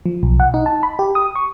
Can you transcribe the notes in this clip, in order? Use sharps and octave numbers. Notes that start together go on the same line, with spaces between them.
F3
B1
F#5
D#4
A5
B5
G4
D#6
C#6